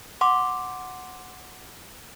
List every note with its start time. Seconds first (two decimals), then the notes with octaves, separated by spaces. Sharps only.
0.21 F#5 C6 D6